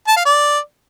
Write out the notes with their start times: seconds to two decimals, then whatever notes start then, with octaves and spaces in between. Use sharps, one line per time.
0.07 A5
0.16 F5
0.25 D5